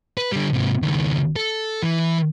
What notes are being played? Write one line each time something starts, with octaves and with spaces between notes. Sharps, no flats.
B4
D3 G3
G#2 C3
C#2 D#3
A4
E3